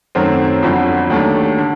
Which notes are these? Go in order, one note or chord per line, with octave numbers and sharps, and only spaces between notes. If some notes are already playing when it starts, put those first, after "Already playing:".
F#2 D#3 F#3 A3 C4
G1 F2 D3 F#3
D#2 D#3 F#3 A3 D4
D3